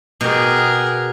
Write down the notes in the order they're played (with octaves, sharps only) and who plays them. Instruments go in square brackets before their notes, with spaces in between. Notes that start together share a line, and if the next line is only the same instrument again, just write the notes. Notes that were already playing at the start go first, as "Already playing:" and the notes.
[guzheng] B2 G4 [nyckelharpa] G#4 A#4